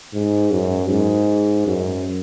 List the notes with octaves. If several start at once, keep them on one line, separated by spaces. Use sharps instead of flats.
G#2
F#2
G#2
F#2